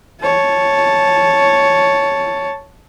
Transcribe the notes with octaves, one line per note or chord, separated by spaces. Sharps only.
C#5 A5